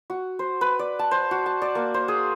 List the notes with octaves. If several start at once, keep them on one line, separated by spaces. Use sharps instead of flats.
F#4
C5
B4
D5
A5
C5
F#4
A5
D5
A#3
C5
G#4